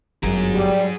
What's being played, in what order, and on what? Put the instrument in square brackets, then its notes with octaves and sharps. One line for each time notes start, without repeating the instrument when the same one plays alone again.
[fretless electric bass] G1 F#2 [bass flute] F#3 [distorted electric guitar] G#4 A#5
[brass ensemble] G3